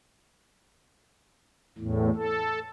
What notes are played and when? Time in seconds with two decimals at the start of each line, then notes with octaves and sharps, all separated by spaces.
1.78 E2 A2
2.15 A4